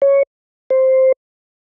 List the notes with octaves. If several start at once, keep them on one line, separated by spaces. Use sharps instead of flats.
C#5
C5